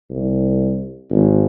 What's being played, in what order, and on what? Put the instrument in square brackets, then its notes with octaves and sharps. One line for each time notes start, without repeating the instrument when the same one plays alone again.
[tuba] C2
G#1